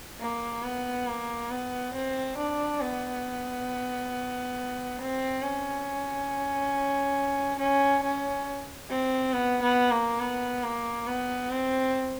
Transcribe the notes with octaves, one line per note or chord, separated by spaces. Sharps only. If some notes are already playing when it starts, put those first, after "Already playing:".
A#3
B3
A#3
B3
C4
D4
B3
C4
C#4
C#4
C#4
C4
B3
B3
A#3
B3
A#3
B3
C4